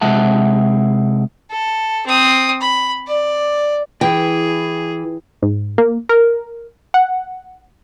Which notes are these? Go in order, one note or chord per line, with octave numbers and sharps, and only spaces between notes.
C3 G#3 E5 F#5 A5
A4
C4 D#6
B5
D5
E3 G#4 G5
G#2
A#3
A#4
F#5